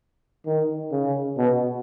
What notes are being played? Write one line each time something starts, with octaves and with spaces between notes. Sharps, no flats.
D#3
C#3
B2